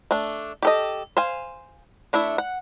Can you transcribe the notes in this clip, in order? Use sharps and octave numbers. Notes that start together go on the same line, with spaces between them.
A3 D4
G4 A4 D#5
C5 F5 G#5
A3 D4 E4 E5
F#5